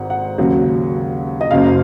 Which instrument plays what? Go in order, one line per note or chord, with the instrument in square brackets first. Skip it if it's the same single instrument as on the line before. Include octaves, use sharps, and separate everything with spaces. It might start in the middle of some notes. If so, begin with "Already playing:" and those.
Already playing: [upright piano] G#1 G#2 F#5
F#5
D#2 C#3 F#3
D#5
F#1 F#2 C#3 F5